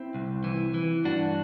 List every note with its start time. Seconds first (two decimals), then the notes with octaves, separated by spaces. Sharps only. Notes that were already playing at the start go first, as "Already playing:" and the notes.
Already playing: C4 E4
0.14 C2
0.44 E3
0.74 E3
1.05 G2 D4 F#4